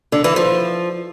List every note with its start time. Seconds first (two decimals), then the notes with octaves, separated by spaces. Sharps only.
0.12 D3
0.24 E3
0.36 F3